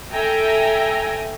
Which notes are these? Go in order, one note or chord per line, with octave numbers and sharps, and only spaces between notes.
A4 E5 G5 G#5 A#5